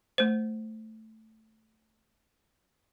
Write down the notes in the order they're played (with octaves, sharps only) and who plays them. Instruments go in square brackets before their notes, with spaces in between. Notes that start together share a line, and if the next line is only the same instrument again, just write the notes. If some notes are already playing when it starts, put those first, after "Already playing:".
[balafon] A3 C5